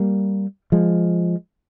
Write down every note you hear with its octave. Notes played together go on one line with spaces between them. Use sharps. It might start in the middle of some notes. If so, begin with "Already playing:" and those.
Already playing: G3 A#3
F3 G#3